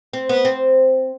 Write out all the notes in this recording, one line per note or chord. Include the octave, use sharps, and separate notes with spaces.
C4
B3
C4